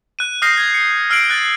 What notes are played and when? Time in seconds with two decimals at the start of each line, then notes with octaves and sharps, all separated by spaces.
0.19 F#6 D#7
0.42 D#6 F6 G6 A#6 C7
0.57 G#6
0.74 C#7
1.10 E6 F6 C7 D7 F#7
1.30 F#6 A6